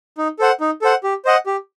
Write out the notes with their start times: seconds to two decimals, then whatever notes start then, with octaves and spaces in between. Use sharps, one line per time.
0.18 D#4
0.39 A4 C5 F#5
0.60 D#4
0.82 A4 C5 F#5
1.03 G4
1.25 C5 D#5 F#5
1.46 G4